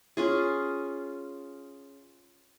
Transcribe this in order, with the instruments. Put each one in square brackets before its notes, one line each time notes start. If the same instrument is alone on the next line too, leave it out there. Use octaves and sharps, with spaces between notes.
[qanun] C#4 F4 G#4